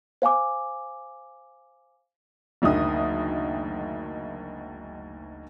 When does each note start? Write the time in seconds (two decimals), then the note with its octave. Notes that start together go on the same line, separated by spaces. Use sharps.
0.22 C5 F5 G#5 D6
2.62 F#1 D2 D#3 G#3 D#6